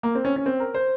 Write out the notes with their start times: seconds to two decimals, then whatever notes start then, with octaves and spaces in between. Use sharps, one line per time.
0.03 A#3
0.15 C4
0.25 C#4
0.36 C#4
0.46 C4
0.60 A#4
0.74 C5